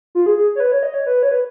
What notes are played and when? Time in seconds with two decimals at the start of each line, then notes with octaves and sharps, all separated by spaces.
0.15 F4
0.26 G#4
0.37 G#4
0.55 C#5
0.60 B4
0.72 C#5
0.83 D#5
0.94 C#5
1.06 B4
1.23 C#5
1.31 B4